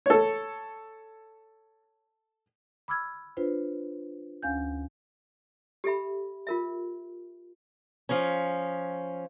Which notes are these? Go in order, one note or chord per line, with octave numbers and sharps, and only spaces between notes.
A4 C#5
B5 D6 E6 F6 G#6
D4 F4 B4 C5
D2 C#4 F5 G#5 G6
G4 A4 E5 B5
F4 A#4 E5
F3 C#4